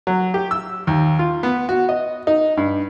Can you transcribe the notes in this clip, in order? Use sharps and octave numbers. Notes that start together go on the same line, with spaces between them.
F#3
G4
E6
D#2
F4
B3
F#4
D#5
D#4
G2